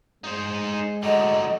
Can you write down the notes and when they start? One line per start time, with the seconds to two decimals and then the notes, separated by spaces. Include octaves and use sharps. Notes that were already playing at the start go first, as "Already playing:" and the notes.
0.24 G#3 D#4 C5
1.03 D3 F#3 D#5